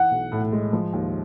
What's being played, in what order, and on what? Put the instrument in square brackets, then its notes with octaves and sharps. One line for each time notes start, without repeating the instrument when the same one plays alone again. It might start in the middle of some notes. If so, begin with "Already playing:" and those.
Already playing: [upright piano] E3 [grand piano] F#5
[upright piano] B1
A2
G#3
F3
D#2